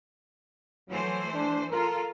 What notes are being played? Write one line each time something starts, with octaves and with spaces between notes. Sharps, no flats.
E3 F#3 A3 C5
D4
F4 A4 A#4